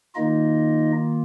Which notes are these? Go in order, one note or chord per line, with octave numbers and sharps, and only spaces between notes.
D#3 A#3 D#4 F4 D#5